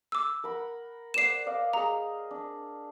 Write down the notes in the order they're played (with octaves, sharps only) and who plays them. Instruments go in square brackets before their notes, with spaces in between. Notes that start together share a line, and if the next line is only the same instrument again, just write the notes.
[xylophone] D6 E6
[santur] A#4 F#5 B5
[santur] C5 D5 F#5 [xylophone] C7 E7
[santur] D5 D#5 F5
[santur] G#4 D#5 [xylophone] A#5
[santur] D4